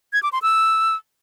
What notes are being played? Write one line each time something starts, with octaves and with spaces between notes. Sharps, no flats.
G#6
D6
C6
E6